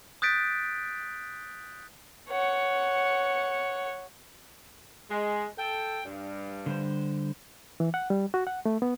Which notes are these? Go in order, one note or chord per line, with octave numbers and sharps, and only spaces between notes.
D#6 F#6 G6 A6 B6 D7
C#5 F#5
G#3
A4 G5
G2
D3 G3 C5
E3
F#5
G3
F#4
F#5
A3
B3